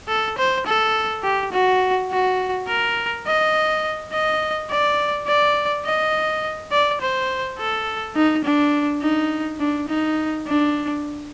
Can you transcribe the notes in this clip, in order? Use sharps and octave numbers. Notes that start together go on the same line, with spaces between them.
A4
C5
A4
G4
F#4
F#4
A#4
D#5
D#5
D5
D5
D#5
D5
C5
A4
D#4
D4
D#4
D4
D#4
D4